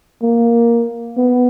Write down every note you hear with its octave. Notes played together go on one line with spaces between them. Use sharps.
A#3
B3